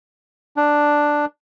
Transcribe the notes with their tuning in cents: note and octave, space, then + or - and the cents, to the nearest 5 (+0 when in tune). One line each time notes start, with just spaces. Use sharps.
D4 +5